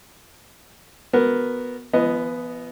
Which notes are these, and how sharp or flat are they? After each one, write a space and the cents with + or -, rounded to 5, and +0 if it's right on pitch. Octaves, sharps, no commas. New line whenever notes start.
B3 +0 F#4 +0 A#4 +0
F3 -45 B3 +0 D#5 +0